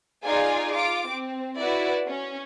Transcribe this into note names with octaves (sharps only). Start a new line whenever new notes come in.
D#4 F4 G#4 D5 G#5
F4 D6 D7
C4
E4 F#4 B4 D5
C#4